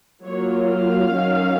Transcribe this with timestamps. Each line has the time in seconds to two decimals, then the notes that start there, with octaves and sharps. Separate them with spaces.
0.24 F#3 A#3 F4 C#5
0.67 F5
1.11 D#3 F#3 C#4